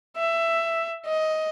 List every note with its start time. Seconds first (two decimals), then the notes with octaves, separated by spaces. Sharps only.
0.17 E5
1.06 D#5